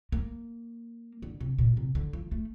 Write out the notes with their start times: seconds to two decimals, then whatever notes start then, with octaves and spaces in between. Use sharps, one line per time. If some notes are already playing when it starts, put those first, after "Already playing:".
0.12 A#3
1.22 D3
1.41 C3
1.58 A#2
1.77 C3
1.95 D3
2.13 F3
2.32 A3